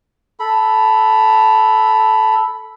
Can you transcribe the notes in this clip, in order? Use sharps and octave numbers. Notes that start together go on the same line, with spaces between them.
A4 B5